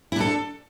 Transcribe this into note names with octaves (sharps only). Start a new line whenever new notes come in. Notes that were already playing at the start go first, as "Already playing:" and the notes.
D4 E4 A4